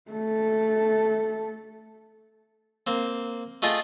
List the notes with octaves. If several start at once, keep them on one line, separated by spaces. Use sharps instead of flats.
A3 A4
A#3 C4
A3 F4 G#4 D#5 G5